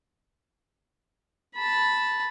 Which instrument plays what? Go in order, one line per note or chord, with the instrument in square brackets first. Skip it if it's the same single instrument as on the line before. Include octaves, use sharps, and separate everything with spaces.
[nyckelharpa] A5 B5